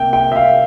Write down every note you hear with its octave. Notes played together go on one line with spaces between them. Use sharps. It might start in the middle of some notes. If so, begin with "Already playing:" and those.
Already playing: C3 A#3 E5 G5
G5
E5
F5